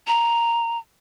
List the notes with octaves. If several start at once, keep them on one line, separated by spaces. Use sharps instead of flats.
A#5